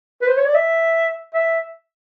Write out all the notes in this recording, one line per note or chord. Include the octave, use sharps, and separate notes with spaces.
B4
C5
C#5
D5
E5
E5